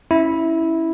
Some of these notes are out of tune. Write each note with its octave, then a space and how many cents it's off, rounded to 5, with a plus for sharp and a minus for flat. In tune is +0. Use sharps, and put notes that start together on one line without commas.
C#4 +0 E4 -10